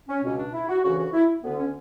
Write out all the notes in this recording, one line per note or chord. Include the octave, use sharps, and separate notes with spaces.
C#4
C#2 B2 C#4
D4
E4
F#4
D2 C#3 E3 F#4
F#4
E4
D2 D3 B3
C#4